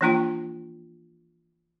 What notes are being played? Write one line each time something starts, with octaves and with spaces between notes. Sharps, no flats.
E3 F3 A#3 D4 F4 G5